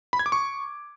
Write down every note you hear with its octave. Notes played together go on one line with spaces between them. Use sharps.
B5
G#6
D6
C#6